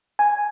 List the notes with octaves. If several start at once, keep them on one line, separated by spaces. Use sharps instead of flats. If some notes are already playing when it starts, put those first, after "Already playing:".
G#5